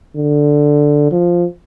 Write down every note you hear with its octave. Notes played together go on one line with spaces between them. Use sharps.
D3
F3